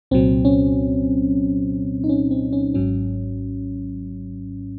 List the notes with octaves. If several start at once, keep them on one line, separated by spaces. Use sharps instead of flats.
C2 A#2 F#3 C4
C#4
D#4
C#4
C4
C#4
G#1 G#2 F#3 C#4